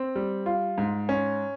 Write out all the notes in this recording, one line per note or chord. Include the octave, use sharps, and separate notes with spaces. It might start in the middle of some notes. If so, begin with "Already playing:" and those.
Already playing: C4
G3
F4
G#2
C#4